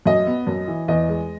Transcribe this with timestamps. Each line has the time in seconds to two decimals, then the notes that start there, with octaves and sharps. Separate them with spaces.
0.06 F#2 D#5
0.27 B3
0.47 F#2
0.68 E3
0.88 E2 D#5
1.09 G#3